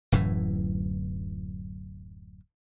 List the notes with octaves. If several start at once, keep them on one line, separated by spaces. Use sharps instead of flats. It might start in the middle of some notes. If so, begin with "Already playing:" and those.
D1 F#2 A2 E3